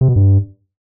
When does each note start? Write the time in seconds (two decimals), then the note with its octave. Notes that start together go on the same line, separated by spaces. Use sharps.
0.01 C3
0.08 B2
0.16 G2